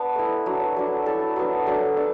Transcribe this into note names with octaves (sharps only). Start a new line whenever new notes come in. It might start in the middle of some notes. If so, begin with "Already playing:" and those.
Already playing: B3 D4 A5 B5
A3 E4
F#3 D4
B4
F#3 D4 A4
A3 E4 A4
F#3 B3 D4
F#3 A3 D4 A4
A3 D4 B4